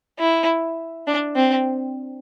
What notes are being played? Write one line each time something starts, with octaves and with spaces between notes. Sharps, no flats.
E4
D4
C4